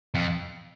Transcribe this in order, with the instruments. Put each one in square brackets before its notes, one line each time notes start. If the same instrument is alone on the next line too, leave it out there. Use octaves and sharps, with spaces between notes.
[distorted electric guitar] F2